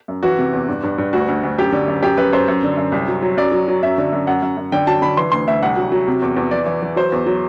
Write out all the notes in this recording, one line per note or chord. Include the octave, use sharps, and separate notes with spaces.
F#2
E3 F#4
C3
E2
G2
G2
G2
D2 F#4
D2
D2
F#2 G4
D3
F#2
F#2 G4
F#2 B4
F#2 C5
F#2
D3
F#2
C2
F#3
F#3
F#2 D5
F#3
F#3
F#2 E5
D3
F#2
F#2 F#5
F#2
F#2
D3 G5
F#3 A5
D3 B5
E3 C6
D2 C6
D2 E5
C2 F#5
F#3
F#3
C3
E2
E2
E3 D5
E3
E3
F#3 C5
E2
F#3